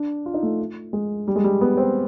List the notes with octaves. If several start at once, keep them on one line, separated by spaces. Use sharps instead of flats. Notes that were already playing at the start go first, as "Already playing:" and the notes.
Already playing: D4
F4
D#4
A3
G#3
G3
G#3
G3
B3
C4